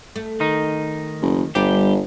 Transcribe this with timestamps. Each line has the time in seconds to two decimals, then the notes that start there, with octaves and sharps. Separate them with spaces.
0.16 A3
0.40 D#3 D#4
1.22 F#1
1.55 G1 G3 D4 G4